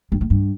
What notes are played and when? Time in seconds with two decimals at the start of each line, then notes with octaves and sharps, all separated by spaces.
0.12 G2
0.21 A2
0.30 G2